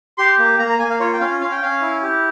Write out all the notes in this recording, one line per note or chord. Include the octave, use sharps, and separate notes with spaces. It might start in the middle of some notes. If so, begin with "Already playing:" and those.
G4 C6
A#3
A#3 A#5
A#5
A#3 G#5
F5
F4 C#5
G5
C#4 F5
C#4 F5
G5
C#4 F5
E4
G4